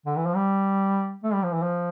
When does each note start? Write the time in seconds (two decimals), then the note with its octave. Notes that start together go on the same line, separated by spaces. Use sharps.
0.06 D3
0.17 E3
0.26 F3
0.36 G3
1.24 A3
1.34 G3
1.43 F3
1.53 E3
1.62 F3